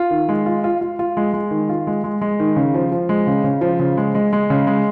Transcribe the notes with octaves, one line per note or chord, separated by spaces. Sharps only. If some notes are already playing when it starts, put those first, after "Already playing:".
Already playing: F4
D#3
G#3
F4
F4
F4
F4
G#3
G#3
D#3
F4
G#3
G#3
G#3
D#3
C#3
F3
F3
G#3
C#3
C#3
F3
C#3
G#3
G#3
G#3
C#3
G#3